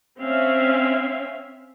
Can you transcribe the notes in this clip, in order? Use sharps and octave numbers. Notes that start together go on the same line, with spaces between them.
C4 C#4 E5 F5